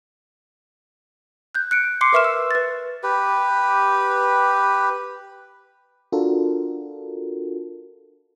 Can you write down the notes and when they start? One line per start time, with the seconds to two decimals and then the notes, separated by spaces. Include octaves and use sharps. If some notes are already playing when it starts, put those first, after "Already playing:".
1.55 F#6 G6
1.71 F#6 C#7 D7
2.01 C6 D6 C7 C#7
2.13 A#4 B4 E5 C#6 F6 E7
2.24 E6
2.51 B4 A6
3.03 G4 B4
6.12 D4 F4 F#4 A4 A#4